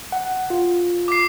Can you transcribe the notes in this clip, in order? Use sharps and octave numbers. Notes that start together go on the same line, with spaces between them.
F#5
F4
D6 C7